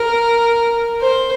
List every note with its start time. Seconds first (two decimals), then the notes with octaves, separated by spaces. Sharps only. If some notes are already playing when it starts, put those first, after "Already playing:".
Already playing: A#4
1.01 C5